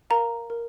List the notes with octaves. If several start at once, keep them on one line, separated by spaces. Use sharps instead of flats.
A#4 F5 A#5
A#4